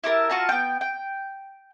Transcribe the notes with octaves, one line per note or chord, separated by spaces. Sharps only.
E4 G4 A#4 A5
F4 F#4 A5 A#5
B3 G5
G5